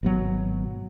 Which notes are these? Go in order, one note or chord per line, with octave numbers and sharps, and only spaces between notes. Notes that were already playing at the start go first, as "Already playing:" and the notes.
G#1 B2 F#3